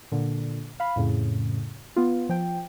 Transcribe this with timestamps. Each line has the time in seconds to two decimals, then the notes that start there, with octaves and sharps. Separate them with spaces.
0.12 A#2 D3
0.80 F5 B5
0.96 F2 A2 C#3
1.96 B3 F4
2.29 F3 G5